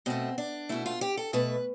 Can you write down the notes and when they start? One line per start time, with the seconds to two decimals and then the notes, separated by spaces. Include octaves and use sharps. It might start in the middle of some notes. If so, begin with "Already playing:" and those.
0.06 B2 A3 C4
0.38 D4
0.69 B2 A3 E4
0.86 F4
1.01 G4
1.17 A4
1.33 B2 A3 B4